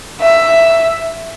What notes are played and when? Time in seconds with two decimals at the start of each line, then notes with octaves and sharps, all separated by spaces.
0.21 E5